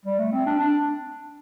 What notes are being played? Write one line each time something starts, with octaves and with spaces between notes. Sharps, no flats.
G3
A3
C4
D4
D4